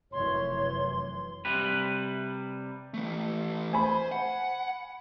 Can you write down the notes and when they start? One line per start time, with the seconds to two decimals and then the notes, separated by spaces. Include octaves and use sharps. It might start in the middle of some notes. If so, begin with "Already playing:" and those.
0.12 F1 F#2 E3 C#5 C6
1.45 C3 G3 B4
2.94 E3 A3
3.73 C5 G#5 B5
4.12 F#5